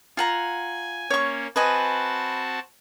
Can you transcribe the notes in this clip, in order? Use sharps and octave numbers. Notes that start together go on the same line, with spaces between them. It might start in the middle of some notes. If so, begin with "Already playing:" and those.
F4 F#5 G#5 A#5
A#3 C#4 C#5 C#6
C4 F#4 B4 D#5 G#5 A5